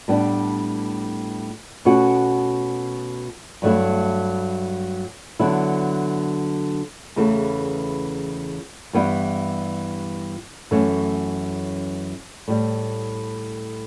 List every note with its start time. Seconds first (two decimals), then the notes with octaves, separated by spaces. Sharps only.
0.08 A2 G3 B3 D4
1.85 B2 A3 C#4 F#4
3.62 G2 F#3 A3 E4
5.40 D3 F#3 B3 E4
7.16 E2 C#3 E3 A3
8.93 G2 E3 G3 B3 E4
10.71 F#2 E3 A3 C#4
12.48 A2 G3